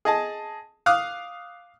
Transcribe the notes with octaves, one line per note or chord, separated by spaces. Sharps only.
G#4 D#5 A5
F5 D6 D#6 F6 F#6